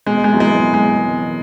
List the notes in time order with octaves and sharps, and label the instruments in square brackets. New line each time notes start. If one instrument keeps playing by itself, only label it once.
[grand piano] B2 [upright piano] G#3
[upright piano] G#3
[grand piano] F#3 B3 E4
[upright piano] G#3
[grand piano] B2
[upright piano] G#3